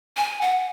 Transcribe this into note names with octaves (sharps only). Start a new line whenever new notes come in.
G#5
F#5